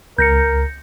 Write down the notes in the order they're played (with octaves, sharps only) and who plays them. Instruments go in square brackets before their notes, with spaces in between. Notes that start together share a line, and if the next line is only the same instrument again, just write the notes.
[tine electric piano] C#2 [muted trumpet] A#4 [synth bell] G6 A#6 C#7